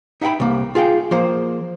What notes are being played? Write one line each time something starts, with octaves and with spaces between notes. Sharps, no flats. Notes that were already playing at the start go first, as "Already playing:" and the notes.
D#4 E5 F#5 G5 B5
C2 A#3
F4 G#4 F5 G5
F3 A#3 C5